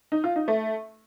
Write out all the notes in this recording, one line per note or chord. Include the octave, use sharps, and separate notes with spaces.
D#4
F4
D#4
A3